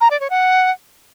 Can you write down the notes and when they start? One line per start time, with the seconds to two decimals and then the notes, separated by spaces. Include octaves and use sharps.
0.01 A#5
0.11 D5
0.20 C#5
0.30 F#5